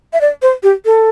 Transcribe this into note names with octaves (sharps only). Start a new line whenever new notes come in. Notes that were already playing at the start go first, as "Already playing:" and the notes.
E5
D5
C5
G4
A4